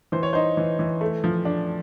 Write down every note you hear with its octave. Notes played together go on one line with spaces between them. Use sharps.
E3 C5
C#5
D#4 C5
E3
E3
A3
F3
D4